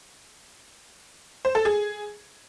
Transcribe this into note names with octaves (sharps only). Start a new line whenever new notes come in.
C5
A4
G#4